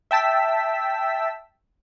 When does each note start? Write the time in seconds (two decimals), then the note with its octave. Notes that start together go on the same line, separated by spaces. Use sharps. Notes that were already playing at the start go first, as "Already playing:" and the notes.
0.11 E5 G5 A5 E6 B6